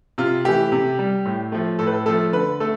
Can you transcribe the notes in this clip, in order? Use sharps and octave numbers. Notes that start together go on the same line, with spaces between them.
C3 F4
E3 A3 G4
C3
G3
A2
F3 A3
A2 A4
B4
A4
F3 A3 A4
D3 B4
A3 A4